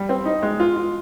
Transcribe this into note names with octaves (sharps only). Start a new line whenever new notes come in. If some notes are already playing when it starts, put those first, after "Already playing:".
Already playing: G3
C4
D#4
G#3
F4
F4